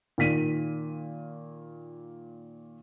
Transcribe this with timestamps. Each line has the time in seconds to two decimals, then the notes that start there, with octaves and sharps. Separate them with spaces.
0.18 A#2 D#3 B6 D#7